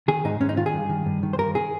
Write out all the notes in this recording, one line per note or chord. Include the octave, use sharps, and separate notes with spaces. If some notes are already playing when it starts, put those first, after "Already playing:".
D#3 G#4
G#2 D#4
G#2 C#4
D#4
D#3 F4
G#4
G2
D#3
G2
D#3
C5
G2 A#4
D#3 G#4